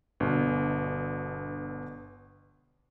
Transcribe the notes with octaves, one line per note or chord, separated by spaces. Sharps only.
G1 B2 D4